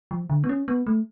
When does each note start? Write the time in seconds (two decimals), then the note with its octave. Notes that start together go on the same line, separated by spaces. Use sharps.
0.11 F3
0.30 D3
0.44 B3
0.49 C#4
0.68 B3
0.87 A3